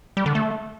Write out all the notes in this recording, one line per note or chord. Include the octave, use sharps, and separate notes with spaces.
G3
D3
A3